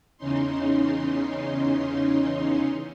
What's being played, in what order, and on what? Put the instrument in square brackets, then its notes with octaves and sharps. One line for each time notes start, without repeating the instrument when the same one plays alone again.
[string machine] E2 C#3 E3 C#4 D#4 C6